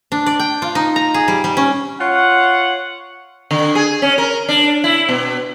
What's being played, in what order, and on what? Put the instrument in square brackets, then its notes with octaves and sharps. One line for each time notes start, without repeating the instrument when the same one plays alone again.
[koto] D4
D5
G5
F4
D#4
A#5
G#4
G3
G3
C#4
[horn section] F4 C#5 F#5
[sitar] D3
G#4
C#4
A#4
D4
E4
B2